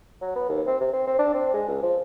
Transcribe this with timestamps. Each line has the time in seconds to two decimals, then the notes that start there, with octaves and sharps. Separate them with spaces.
0.21 F#3
0.36 B3
0.49 D#2
0.67 C4
0.81 C3
0.93 C4
1.07 C4
1.19 D4
1.34 C4
1.54 G#3
1.68 C#2
1.83 F3